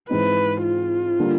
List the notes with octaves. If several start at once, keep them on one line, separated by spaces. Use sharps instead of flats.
G#2 E3 G#3 C4 D#4 B4
F4
D3 G3 A#3